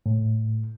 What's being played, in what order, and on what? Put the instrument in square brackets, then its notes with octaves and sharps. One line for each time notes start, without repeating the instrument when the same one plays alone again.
[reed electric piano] A2